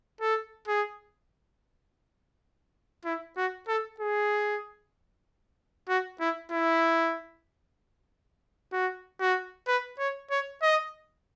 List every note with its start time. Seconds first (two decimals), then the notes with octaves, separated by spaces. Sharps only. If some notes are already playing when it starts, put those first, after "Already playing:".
0.21 A4
0.68 G#4
3.05 E4
3.37 F#4
3.68 A4
4.00 G#4
5.89 F#4
6.20 E4
6.52 E4
8.72 F#4
9.20 F#4
9.68 B4
9.99 C#5
10.31 C#5
10.62 D#5